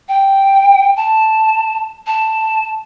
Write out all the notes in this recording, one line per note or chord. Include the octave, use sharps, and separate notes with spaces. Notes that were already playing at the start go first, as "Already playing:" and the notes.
G5
A5
A5